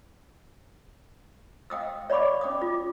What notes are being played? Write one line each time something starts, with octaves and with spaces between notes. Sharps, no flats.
F5 G5 D#6 E6
C#5 D5 F5 B5 C#6 D6
C#4 G5 D6 D#6
F4 D6